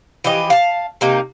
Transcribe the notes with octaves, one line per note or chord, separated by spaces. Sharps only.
E3 F3 G4 D#5
F5 A5
C3 A#3 D#4